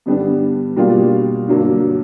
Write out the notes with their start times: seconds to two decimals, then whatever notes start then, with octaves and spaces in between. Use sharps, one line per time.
0.06 G2 D3 G3 B3 D4
0.76 B2 G3 A#3 D4 F4
1.48 G2 D3 F#3 A#3 D4